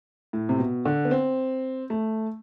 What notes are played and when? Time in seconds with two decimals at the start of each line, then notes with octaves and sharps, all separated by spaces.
0.33 A2
0.49 C3
0.59 B2
0.85 D3
1.05 B3
1.11 C4
1.90 A3